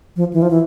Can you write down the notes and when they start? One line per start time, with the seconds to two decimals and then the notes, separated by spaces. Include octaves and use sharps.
0.16 F3
0.33 E3
0.42 F3
0.51 E3